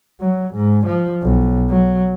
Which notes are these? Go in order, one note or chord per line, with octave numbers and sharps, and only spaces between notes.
F#3
G#2
F3
B1
F#3